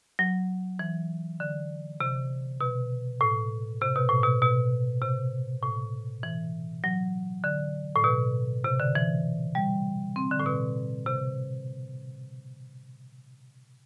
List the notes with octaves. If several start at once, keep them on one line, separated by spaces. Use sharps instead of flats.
F#3
E3
D3
C3
B2
A2
C3
B2
A2
B2
B2
C3
A2
E3
F#3
D3
A2
B2
C3
D3
E3
G3
C4
D3
A2
B2
C3